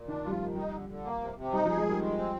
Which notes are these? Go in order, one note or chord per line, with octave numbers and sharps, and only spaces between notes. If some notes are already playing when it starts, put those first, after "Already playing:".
Already playing: A#2
D#3 D4
G3 F4
F3
D#3
G3 D#4
D3
D3
A#3
C3
C3
G3 D#4
F3
G#4
G#3
D#3 G3
G#3
C4